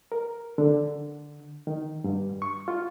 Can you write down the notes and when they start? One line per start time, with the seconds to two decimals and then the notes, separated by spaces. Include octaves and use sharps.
0.12 A#4
0.58 D3
1.67 D#3
2.04 G2
2.42 C#6
2.68 F4